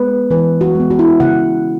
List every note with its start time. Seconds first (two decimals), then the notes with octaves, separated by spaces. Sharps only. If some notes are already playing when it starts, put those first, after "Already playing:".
Already playing: G#3 B3 B4
0.31 E3 B4
0.61 F#4
0.75 G#3 B3
0.90 F#4
0.99 E4
1.07 F#4
1.20 C#3 F#5